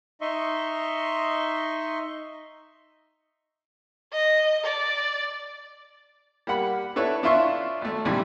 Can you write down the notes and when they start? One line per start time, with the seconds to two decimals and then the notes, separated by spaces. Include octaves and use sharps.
0.21 D#4 D#5 E5 C6 C#6
4.13 D#5
4.64 D5
6.47 G3 A#3 F#5 B5
6.96 D4 E4 A4 B4 C#5
7.23 D4 E4 F4 E5 C6 C#6
7.81 G#1 A3
8.05 A#1 G#2 C#3 E3 G3